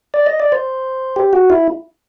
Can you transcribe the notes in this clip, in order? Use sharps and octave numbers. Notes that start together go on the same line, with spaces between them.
D5
D#5
D5
C5
G4
F#4
E4